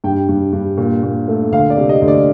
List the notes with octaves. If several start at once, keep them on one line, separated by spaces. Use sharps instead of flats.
G2 G5
G2
G2
A#2
A#2
A3
D2 F5
D5
C3
D#5
D2
D5